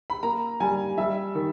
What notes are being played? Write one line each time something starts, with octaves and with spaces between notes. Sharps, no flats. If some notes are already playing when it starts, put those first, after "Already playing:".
B5
A#3 A#5
G3 G#5
G3 E5
D#3